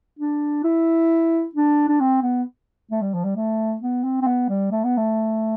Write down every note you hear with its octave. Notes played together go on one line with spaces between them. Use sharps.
D4
E4
D4
D4
C4
B3
A3
G3
F3
G3
A3
B3
C4
C4
B3
G3
A3
B3
A3